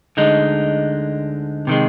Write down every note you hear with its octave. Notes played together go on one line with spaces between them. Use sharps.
D2 D3 G#3 D#4
C3 D#3 G#3